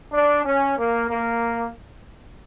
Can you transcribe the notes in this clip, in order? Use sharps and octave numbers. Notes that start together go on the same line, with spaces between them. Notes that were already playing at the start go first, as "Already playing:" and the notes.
D4
C#4
A#3
A#3